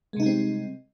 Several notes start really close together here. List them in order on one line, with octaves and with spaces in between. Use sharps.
G#3 C3 D#4 G3 C4